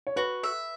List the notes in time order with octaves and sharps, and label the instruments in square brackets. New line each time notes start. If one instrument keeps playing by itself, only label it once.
[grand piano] C#5
[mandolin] F#4 [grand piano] B4
[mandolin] E5